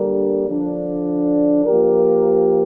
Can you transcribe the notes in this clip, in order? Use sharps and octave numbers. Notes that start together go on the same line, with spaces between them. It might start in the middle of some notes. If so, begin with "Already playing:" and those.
Already playing: D3 G3 A#3 D4 A#4
D3 F3 D4
F3 A#3 G4 A#4